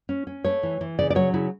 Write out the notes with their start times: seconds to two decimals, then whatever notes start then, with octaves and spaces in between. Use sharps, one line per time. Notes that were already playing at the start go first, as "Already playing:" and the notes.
0.09 C#4
0.27 C#4
0.44 A3 C#5
0.63 E3
0.81 E3
0.99 C#3 D5
1.10 D5
1.15 F#3 C#5
1.33 C#3 E4